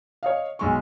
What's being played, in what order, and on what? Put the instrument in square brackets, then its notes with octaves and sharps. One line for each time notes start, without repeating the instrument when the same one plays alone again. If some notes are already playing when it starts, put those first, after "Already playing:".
[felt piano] C#5 D#5 F5
B1 G#3 C#6